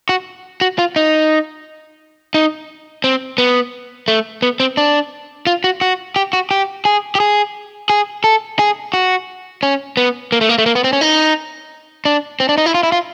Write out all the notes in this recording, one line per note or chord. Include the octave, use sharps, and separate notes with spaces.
F#4
F#4
F4
D#4
D#4
C4
B3
A3
B3
C4
D4
F4
F#4
F#4
G4
F#4
G4
G#4
G4
G#4
G#4
A4
G#4
F#4
C#4
B3
A#3
A3
A#3
A3
A#3
B3
C4
C#4
D#4
D4
C4
D4
D#4
E4
F4
E4
F4